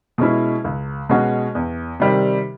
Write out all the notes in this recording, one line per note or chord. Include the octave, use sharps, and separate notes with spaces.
B2 G#3 C#4 E4
C#2
B2 G#3 C#4 F#4
E2
C3 D#3 G3